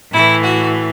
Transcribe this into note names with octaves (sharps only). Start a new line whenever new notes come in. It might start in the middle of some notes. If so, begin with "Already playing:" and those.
A2 E3 E4
F#4